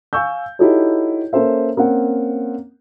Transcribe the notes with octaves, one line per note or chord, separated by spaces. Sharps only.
F5 G#5 C#6 E6 G6
D#4 E4 F#4 G4 A4 C#5
A#3 C#4 A4 C5 E5
A#3 C4 C#4 F#5